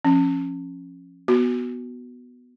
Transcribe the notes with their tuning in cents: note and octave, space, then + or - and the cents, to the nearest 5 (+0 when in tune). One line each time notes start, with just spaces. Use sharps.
F3 -5 C#4 -20
B3 +0 F#4 +0